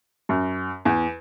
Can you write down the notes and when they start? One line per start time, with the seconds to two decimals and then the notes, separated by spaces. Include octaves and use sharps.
0.29 F#2
0.85 E2